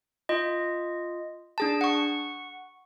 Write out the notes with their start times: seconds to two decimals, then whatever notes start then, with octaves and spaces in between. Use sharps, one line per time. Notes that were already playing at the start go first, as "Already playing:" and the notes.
0.29 F4 D#5
1.58 D4 G#4 A5
1.81 F#5 C#6